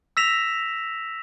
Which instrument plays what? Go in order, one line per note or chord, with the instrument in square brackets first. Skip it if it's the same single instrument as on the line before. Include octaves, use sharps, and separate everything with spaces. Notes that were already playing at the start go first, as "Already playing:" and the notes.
[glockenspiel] E6 A#6 B6 E7 F7